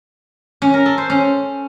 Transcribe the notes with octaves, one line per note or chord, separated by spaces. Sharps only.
C#4
A#4
A4
C5
C#4